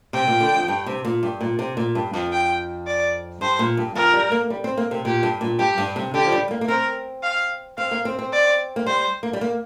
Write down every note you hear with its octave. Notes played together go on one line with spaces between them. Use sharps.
C3 G5
A#2
D3
F2
G2
C3
A#2
G2
A#2
C3
A#2
G2
F2
G5
D5
G2 C5
A#2
G2
F2 A#4
G3
A#3
G3
C4
A#3
C3
A#2 G4
G2
A#2
G2 G4
G2
C3
D3 G4
F3
G3
A#3
A#3
C4 A#4
F5
C4 F5
A#3
C4
C4
D5
A#3
G3 C5
A#3
G3
A#3